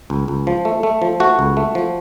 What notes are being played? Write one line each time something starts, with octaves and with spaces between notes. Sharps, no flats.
C#2
C#2
F3
A3
A3
F3
A3 F#4
C#2
A3
F3